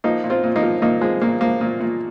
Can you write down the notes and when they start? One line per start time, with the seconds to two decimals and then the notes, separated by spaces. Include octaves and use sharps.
0.04 F3 A#3 D#4
0.24 A#2
0.30 C4 F4
0.44 A#2
0.56 A#3 D#4
0.63 F3
0.82 A#2 A#3 D#4
1.01 F3 G#3 C4
1.21 A#2 A#3
1.41 F3 A#3
1.61 A#2
1.80 A#2